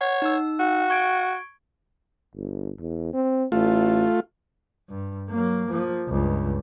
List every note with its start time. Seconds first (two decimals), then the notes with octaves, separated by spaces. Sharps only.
0.01 C#5 F#5
0.22 D#4 E6
0.59 F#4
0.90 C#6 G#6 D7
2.35 G1
2.78 E2
3.14 C4
3.52 A1 A3 F4
4.89 G2
5.30 F#3 A#3
5.70 F3 A#3
6.08 C#2 G2